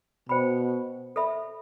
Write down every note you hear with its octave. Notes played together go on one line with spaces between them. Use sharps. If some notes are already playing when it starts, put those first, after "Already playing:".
B2 C5 G5 B5
A4 E5 B5